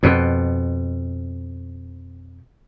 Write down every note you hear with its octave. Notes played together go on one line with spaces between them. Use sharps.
F2 B2